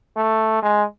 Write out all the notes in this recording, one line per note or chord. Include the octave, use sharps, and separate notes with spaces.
A3
G#3